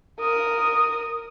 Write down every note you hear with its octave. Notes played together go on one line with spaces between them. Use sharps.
A#4 D#6